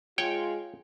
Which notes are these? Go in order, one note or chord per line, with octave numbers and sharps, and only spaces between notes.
G#3 F4 C#5 G5